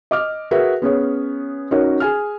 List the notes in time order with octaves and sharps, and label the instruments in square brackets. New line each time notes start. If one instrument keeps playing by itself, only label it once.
[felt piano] D#5 D6 F6
F#4 G#4 A#4 B4 E5
B3 C#4 G#4 C#5
C#4 D#4 F#4 A#4 C#5
G#4 G#5 F6